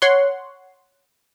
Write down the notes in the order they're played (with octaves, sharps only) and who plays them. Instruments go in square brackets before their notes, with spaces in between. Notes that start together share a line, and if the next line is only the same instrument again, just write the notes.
[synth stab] C#5 F#5 C6